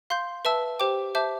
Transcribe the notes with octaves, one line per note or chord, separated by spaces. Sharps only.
F5 C6 G6
B4 E5 A5 E6
G4 C5 G5 D6
C5 E5 A5 D6 G6